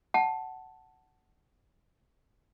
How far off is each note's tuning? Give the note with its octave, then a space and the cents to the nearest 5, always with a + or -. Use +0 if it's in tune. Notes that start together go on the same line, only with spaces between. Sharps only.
F#5 +15 A5 +0